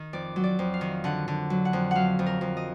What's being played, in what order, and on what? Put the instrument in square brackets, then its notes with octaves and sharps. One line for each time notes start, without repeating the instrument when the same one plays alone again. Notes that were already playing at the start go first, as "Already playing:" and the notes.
Already playing: [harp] D#3
F2 D5
F#3
D5
F2
F5
D#3
D3 F#5
D3
F#3
F#5
F2
F#3 F5 F#5
F2
A#4
F2
D#5